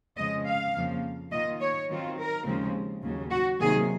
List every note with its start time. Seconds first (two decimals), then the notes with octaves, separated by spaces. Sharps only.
0.17 F2 C#3 F3 G#3 D#5
0.47 F5
0.75 F2 C#3 F3 A#3
1.31 D#3 A#3 F4 D#5
1.61 C#5
1.89 D#3 F#3 C4 F4
2.18 A#4
2.45 D#2 C#3 F3 G#3 C4
3.03 D#2 C#3 F#3
3.31 F#4
3.60 C3 D#3 F#3 A#3 G#4